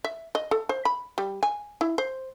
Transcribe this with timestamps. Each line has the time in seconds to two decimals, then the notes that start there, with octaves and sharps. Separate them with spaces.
0.04 E5
0.35 D#5
0.51 A4
0.69 C5
0.85 B5
1.18 G3
1.43 G#5
1.81 E4
1.98 C5